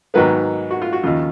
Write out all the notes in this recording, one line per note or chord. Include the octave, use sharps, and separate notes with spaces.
G#2 D#3 F#3 B3 B4
F#4
F4
F#4
D#2 C#3 F3 F4